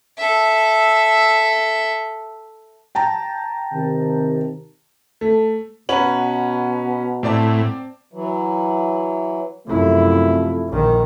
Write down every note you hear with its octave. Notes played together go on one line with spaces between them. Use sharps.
A4 E5
G5 A5 A#5
C3 D#3
A3
B2 C#4 B4 F#5 A#5 F#7
A2 C4 D5 A5
E3 F#3
F#2 C3 F3 A3 E4
A#1 D#3